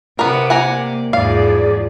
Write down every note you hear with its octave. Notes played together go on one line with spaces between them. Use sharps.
C3 B3 A#4 D5
A#3 F#5 G#5 A#5
E2 G#2 F3 G#4 D5 F5